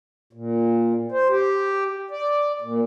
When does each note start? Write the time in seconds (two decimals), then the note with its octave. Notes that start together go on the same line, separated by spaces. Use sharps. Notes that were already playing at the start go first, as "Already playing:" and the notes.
0.33 A#2
1.12 C5
1.29 G4
2.11 D5
2.62 A#2